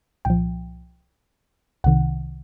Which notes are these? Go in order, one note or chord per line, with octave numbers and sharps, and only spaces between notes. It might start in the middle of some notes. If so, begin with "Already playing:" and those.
C2 A#2 F3 G5
C2 C3 D#3 F#5